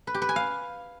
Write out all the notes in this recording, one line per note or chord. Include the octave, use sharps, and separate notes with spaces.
B4
G4
B4
G#5
F5